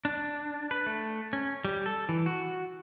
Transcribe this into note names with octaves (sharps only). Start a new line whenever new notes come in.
D4
B4
A3
C#4
G3
A4
E3
F#4